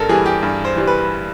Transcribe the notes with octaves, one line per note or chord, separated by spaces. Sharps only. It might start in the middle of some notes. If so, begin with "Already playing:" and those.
Already playing: G2 A4 A#4
E3 G3 G#4
G4
G2
C5
E3 G3
B4